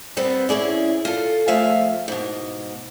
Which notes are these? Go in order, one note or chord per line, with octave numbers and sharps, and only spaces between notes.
G3 B3 C4 B4
C#4 E4 G#4 D5
F4 A4
F3 G#3 A3 E5 F5
G#2 B2